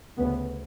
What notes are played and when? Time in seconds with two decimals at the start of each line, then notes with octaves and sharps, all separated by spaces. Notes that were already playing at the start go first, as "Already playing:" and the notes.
0.17 D2 C#3 B3